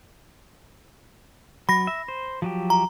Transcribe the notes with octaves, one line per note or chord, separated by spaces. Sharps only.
F#3 B5 A#6
E5
C5
F3 F#3 G4
A#5